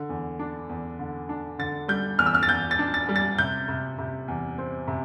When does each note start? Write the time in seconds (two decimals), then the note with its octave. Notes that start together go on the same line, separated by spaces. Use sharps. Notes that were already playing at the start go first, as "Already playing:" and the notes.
Already playing: D3
0.09 E2
0.39 D4
0.69 E2
0.99 D3
1.29 D4
1.59 D3 A6
1.88 G3 G6
2.19 E2 F6
2.26 E6
2.35 F6
2.43 A6
2.49 E2 G6
2.71 A6
2.79 D4
2.94 A6
3.09 G3
3.16 A6
3.38 C3 G6
3.68 C3
3.98 C3
4.28 E2
4.58 C4
4.88 C3